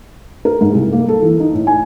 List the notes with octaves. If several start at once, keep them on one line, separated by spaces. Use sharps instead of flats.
A#4
G#2
C2
A#3
A4
E3
D#4
A2
G#5